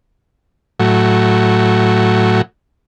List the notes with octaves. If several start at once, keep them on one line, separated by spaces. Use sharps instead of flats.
A2 F#3